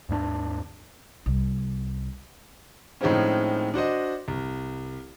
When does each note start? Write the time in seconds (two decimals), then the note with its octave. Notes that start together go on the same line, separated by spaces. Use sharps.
0.09 D#2 G#2 B3 D4
1.26 C2
3.01 A2 D#3 F3 G#3 C4 C#4
3.74 D4 F#4 C5 D#5
4.28 C2